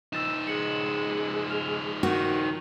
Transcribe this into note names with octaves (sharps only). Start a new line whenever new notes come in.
F3 D#4 E6 A6 E7
G#3 C#7 F#7
F6 F7
D#3 F#4